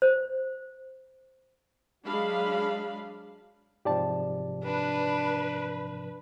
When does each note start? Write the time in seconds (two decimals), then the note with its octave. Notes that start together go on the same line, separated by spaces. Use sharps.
0.02 C5
2.05 F#3 G#3 D4 F5 B5
3.85 G#2 C3 F3 G4 D5 A5
4.64 D4 B4